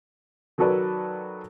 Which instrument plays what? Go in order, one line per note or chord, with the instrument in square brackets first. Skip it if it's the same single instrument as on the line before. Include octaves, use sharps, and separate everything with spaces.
[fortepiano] D#3 F#3 F#4 A4 B4 D5